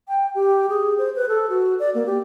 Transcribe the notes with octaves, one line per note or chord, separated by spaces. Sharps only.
G5
G4
G#4
C5
B4
A4
F#4
D5
A#3
G4